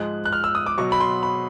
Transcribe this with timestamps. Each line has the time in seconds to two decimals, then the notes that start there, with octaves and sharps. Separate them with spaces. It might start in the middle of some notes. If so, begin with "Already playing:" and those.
Already playing: G#2 F3 G#3 F#6
0.25 F#6
0.33 F6
0.44 E6
0.55 D#6
0.66 D6
0.78 B2 F#3 C#6
0.92 B5
1.00 C6
1.23 B5